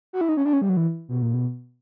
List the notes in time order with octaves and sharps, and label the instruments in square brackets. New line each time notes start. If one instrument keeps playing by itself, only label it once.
[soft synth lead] F#4
E4
D#4
C#4
D4
C#4
G3
F#3
E3
B2
A#2
B2